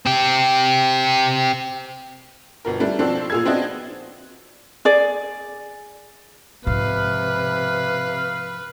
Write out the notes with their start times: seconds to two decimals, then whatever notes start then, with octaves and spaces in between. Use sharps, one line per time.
0.06 C4 G4
2.65 G1 B2 A#4
2.80 G3 A3 D4
2.99 B2 F3 C4 D4 A4
3.30 A#2 F4 G#4 E6 G#6
3.45 B3 C4 D4 F#4 D#5
4.85 G#4 D5
6.67 G#2 C3 F3 B4 F5